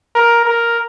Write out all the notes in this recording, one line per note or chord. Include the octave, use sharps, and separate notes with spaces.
A#4
A#4